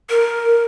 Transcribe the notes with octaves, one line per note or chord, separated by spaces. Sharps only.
A#4